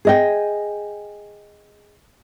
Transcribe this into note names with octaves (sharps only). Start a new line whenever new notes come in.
G#4 D#5 G5